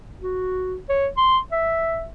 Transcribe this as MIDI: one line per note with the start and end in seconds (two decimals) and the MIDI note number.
0.22 0.77 66
0.89 1.08 73
1.17 1.38 84
1.52 2.07 76